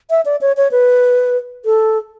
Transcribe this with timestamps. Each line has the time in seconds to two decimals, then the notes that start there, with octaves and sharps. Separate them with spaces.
0.10 E5
0.25 D5
0.41 C#5
0.57 C#5
0.72 B4
1.65 A4